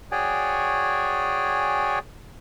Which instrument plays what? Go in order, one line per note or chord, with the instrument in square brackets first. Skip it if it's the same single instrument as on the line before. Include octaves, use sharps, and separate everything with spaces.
[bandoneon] F#4 G#4 C#5 D5 G5 G#5